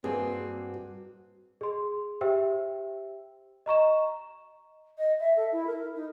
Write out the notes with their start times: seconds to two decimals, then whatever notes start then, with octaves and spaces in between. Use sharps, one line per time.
0.04 G2 A#3 C4 F#4 G#4
1.61 G#4 C6
2.21 G4 C5 E5 G5 E6
3.66 D#5 A#5 C#6 E7
4.98 D#5
5.20 E5
5.36 A4
5.52 E4
5.67 A#4
5.95 D#4